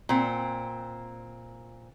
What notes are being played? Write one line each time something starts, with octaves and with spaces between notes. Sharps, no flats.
A#2 C4